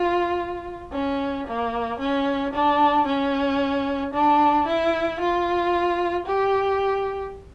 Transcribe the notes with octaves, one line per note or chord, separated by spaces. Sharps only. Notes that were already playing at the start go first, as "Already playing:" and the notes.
Already playing: F4
C#4
A#3
C#4
D4
C#4
D4
E4
F4
G4